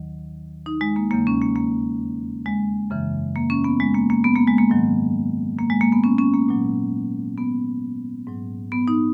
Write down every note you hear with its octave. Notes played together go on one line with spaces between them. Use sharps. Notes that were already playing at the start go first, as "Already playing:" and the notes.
Already playing: D#2 D#3 F#3
D#4
G#3
A#3
E2 C#3 F#3 A#3
C#4
A#3
A#3
G#3
F#2 C#3 E3
A#3
C#4
B3
G#3
A#3
A#3
B3
A#3
G#3
A#3
G#2 D#3 F#3
A#3
G#3
A#3
B3
C#4
C#4
A#3
A#2 F#3
B3
G#2 F#3
B3
D#4